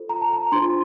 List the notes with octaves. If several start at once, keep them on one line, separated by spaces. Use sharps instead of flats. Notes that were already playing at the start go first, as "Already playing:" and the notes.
Already playing: F4 A4 C5
A#5
A5
A#5
D4 F4 C5 C6